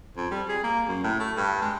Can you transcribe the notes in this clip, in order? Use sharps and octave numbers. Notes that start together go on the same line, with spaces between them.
F2
G3
G#4
A#3
F#2
A2
A3
G2
G#3